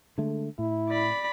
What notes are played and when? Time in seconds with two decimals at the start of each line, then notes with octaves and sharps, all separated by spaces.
0.18 D3 G#3 A3
0.58 A2 E4
0.89 D5 B5